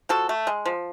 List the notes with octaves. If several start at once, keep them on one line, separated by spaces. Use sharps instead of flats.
F3 F#4 A4
A3
G#3
F3